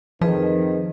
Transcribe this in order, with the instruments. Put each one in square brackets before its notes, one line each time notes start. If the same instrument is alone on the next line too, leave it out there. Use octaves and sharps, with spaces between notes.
[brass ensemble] F2 D#3 [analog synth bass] F3 [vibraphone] G#4 B4 D#5